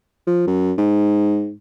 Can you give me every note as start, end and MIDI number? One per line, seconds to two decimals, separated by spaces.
0.27 0.46 53
0.47 0.72 42
0.78 1.53 44